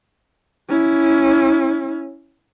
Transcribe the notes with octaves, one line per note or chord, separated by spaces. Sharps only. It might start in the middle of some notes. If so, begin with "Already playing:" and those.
C#4 E4